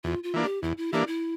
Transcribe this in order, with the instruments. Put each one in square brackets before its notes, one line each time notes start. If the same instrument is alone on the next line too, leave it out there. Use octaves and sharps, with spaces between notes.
[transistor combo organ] E2 [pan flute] F4
[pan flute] F4
[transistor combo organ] E3 A#3 D4
[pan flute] G4
[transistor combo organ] E2 [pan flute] E4
[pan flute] E4
[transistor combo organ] E3 A#3 D4 [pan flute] G4
[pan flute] E4